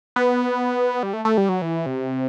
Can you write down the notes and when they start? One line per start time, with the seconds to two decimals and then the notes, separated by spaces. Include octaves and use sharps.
0.16 B3
1.03 G3
1.13 A3
1.25 A3
1.37 G3
1.49 F#3
1.62 E3
1.86 C3